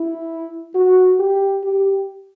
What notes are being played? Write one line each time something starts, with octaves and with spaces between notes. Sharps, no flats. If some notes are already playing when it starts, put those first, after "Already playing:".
Already playing: E4
F#4
G4
G4